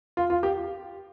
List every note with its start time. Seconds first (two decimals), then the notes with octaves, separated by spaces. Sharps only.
0.17 F4
0.30 F4
0.43 G4